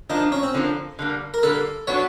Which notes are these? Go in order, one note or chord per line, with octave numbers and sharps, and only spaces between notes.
D3 F3 A#3 D4 D#4
C#4
C4
D3 F3 A#3 D4
D3 G3 A#3
A#4
D3 G3 A#3 A4
F#3 B3 D4 F#4 C#5